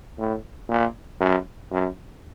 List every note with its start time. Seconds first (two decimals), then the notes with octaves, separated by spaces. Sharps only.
0.18 A2
0.69 A#2
1.20 F#2
1.71 F#2